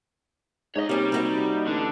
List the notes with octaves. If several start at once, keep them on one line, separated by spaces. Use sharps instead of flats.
G#2 D#4 C#5 D#5
C3 G3 A#3 C#4
A#3 F#4 E5
A1 D3